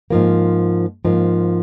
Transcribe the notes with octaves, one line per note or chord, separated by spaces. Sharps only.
G#2 F3 A#3
G#2 F3 A#3